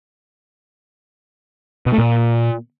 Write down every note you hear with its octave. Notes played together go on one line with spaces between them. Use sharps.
B2
A3
A#2